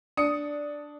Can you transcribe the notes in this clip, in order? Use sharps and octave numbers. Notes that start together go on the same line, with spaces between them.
D4 D#6 C#7